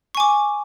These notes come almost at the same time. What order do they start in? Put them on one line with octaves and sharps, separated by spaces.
C#6 G#5 D6